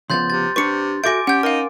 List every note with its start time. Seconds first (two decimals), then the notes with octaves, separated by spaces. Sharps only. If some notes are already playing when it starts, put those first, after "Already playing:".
0.10 C#3 F3 B3 C6 G6 A6
0.30 C3 A6
0.56 C3 D4 G4 B4 C#6 C#7
1.04 F#4 A4 E5 G#5 D6 G6 A#6 D7
1.27 C#4 G4 F#5 G6
1.43 D#4 A#4 F5